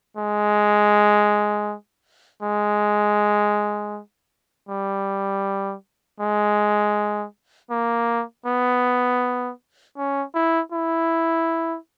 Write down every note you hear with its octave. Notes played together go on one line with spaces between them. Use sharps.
G#3
G#3
G3
G#3
A#3
B3
C#4
E4
E4